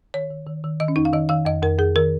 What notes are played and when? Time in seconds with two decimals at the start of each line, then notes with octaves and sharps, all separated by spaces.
0.14 D#3 C#5
0.30 D#3
0.46 D#3
0.64 D#3
0.80 D#3 D#5
0.88 C#4
0.96 F2 D#4
1.05 F5
1.13 D#3 D#5
1.29 D#3 F5
1.45 F2 D#5
1.63 F2 A#4
1.79 F2 G#4
1.96 D#3 A#4